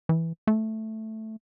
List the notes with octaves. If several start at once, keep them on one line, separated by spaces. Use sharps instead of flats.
E3
A3